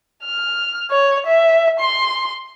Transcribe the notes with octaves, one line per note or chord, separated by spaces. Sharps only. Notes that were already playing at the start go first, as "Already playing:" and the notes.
F6
C#5
E5
C6